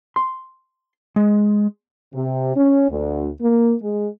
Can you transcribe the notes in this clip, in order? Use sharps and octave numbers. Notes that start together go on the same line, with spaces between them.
C6
G#3
C3
C#4
D2
A#3
G#3